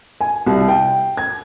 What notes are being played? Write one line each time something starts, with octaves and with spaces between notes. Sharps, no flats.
G#5
C2
G5
G#6